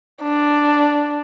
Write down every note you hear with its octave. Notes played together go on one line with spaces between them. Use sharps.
D4